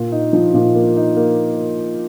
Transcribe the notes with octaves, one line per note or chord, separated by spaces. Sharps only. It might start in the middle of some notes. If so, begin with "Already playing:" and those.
Already playing: A#2
D#4
F3
A#2
A#3
D#4
A#3